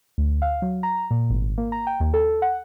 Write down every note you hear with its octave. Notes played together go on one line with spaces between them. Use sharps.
D2
F5
F#3
A#5
A#2
G#1
A#3
A#5
G5
D#2
A4
F#5